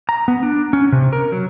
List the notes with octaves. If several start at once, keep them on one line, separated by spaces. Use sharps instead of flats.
A#5
B3
D4
C#4
C3
A#4
F#3